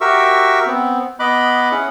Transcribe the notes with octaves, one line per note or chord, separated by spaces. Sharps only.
F#4 G4 A#4 E5 C#6 E6
B3 C4
B3 D#5 B5 D6 F#6
C#4 E4 G#4 F#5